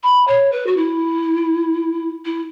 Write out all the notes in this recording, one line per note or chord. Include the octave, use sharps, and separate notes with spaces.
B5
C#5
B4
F#4
E4
E4